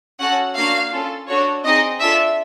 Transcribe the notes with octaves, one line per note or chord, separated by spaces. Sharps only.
C#4 F#4 A4 F#5
A#3 D4 F#4 F5
C#4 F4 A4
D4 F#4 A4 C#5
C4 D#4 G#4 D#5
D4 F4 A4 E5